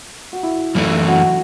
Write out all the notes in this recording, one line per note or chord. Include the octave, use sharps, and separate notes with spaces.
F#4
E4
F#2 E3 A3
F#4